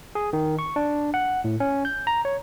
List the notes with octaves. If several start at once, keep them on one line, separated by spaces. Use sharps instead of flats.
G#4
D#3
C#6
D4
F#5
A2
C#4
G6
A#5
C#5